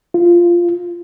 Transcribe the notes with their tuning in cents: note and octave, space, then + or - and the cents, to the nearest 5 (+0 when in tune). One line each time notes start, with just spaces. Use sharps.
F4 -10